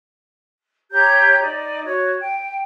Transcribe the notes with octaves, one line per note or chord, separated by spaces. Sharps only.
G4 C#5 A#5 G6
D#4 D5
F#4 C#5
G5